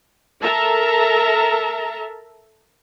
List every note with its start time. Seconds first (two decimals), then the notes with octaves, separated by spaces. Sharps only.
0.42 A4 A#4 E5 A5 A#5